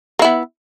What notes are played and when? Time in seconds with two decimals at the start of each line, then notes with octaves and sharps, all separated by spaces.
0.19 A#3
0.22 E4
0.24 B3